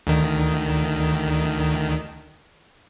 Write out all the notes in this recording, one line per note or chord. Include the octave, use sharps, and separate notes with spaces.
D2 D#3